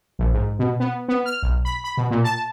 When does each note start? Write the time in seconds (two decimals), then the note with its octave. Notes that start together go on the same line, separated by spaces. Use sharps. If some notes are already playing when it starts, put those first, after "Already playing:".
0.19 A#1
0.33 G#2
0.59 B2
0.80 B3
1.09 B3
1.26 F6
1.42 B1
1.65 B5
1.84 B5
1.97 B2
2.11 A#2
2.24 A5